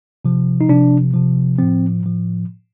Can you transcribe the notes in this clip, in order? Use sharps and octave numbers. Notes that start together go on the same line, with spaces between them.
C3 F3
D#4
C3 F3 D4
C3 F3
A2 F3 C4
A2 F3